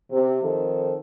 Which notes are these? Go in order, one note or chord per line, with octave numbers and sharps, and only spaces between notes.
C3
D#3 F3 C4 A4